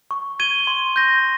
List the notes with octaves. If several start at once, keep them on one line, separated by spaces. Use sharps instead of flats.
C#6
G#6 D#7 G7
C6
G6 A#6